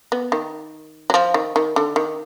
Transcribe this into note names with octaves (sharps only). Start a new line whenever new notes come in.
B3
D#3
F#3
F3
D#3
D#3
D3
D#3